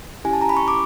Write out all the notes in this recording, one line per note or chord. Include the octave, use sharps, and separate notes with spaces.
C#4 E4 G4 G#5
A5
A#5
B5
C#6
D6